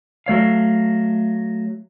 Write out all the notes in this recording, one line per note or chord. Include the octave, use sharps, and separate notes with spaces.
F#3 A3 C#5 F5